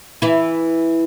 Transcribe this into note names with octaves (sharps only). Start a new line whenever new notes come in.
E3 E4